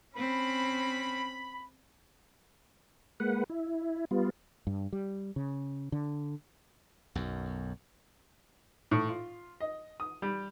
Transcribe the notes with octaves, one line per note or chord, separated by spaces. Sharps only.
C4 C#4 B5
G#3 A#3 B4 F#5
E4
G3 B3 F4
G2
G3
C#3
D3
B1 F#2
A2
F4
D#5
D#6
G3